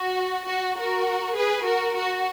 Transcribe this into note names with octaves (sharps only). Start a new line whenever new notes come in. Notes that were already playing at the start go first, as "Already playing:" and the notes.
Already playing: F#4
F#4
F#4 A#4
G#4 B4
F#4 A#4
F#4